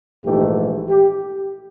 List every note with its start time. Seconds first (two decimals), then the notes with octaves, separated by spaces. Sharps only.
0.25 A#1 G#2 E3 A3 G4
0.88 G4